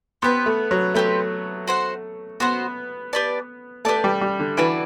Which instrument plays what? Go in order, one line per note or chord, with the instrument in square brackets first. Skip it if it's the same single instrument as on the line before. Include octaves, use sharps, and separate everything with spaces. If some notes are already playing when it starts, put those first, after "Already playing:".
[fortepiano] B3 [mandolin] C4 G4 B4
[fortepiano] A3
F#3
[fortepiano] A3 [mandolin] C4 G4 B4
[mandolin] F#4 C5 F#5
[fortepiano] B3 [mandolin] F#4 C5 F#5
[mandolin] G4 B4 D5 A5
[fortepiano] A3 [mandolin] G4 B4 D5 A5
[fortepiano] G3
G3
D3
[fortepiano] E3 [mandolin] D4 F#4 B4 D5